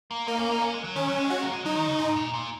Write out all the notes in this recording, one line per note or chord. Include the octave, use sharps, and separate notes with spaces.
A#3
A#3 D#4
C#4
D#4
C#4
G#3
F#3
D#3 C#4
F#3
G#3
F#4
A#3
G#3
F#3 D#4
D#3
C#3
G#2 D#4
A#2
A#2